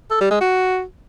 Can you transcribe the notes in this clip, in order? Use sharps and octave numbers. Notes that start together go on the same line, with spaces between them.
A4
G3
G#3
F#4